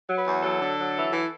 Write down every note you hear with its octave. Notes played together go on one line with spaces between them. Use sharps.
F#3
B4
E2
F#3 A4
D3
F#3
E3
E3